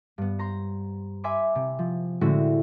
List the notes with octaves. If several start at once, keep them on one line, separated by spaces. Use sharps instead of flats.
G2 B3
C5 A#5 C6
E5 G#5 B5 C6 D6
C3
F3
A2 D3 G#3 C4 E4 F#4